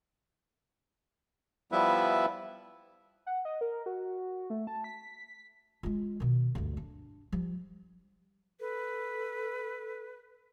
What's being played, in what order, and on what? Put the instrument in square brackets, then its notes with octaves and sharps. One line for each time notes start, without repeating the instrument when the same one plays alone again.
[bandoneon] F3 G3 B3 E4 B4 E5
[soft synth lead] F#5
D#5
A#4
F#4
A3
A5
B6
[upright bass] G#3 F4
B2 D#3
D2 G2
D4
F3 G3
[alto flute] A4 [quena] B4